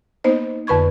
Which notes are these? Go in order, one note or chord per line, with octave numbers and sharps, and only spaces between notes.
A#3 B3 D#4 C5 D#5
F2 D3 B4 B5 C#6 G#6